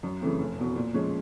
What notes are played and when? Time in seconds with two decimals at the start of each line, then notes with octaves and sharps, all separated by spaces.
0.03 F#2
0.21 C#3 E3 A3 C4
0.40 F1
0.58 E2 B2
0.76 A#2
0.94 F3 G#3 C#4